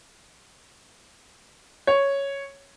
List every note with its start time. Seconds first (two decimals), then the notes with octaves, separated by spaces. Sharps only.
1.87 C#5